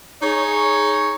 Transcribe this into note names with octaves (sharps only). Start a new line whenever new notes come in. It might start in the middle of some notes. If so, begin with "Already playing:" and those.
D#4 G#4 C#5